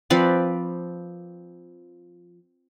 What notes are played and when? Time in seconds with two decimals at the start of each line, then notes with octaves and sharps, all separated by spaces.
0.10 F3 C4 B4 D5